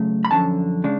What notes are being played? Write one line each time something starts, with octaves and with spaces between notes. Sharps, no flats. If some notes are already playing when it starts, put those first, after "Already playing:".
Already playing: C#3 F#3 A3
B5
F#2 D3 F3 C#4 A5
C#3 G#3 D4